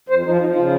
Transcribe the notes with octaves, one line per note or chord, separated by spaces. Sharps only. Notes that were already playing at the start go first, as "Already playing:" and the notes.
F2 C5
F3 D#4
F3 D#4
C#3 F4